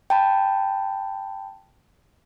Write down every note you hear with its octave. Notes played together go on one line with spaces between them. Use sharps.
G5 A5 B5